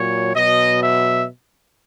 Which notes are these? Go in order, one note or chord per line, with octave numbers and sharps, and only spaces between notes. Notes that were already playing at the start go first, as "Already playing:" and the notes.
Already playing: A#2 F#3 C#5
B2 F#3 D#5
E5